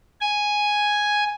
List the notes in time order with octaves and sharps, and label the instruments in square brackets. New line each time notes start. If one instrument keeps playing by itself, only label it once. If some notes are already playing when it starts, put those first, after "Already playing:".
[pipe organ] G#5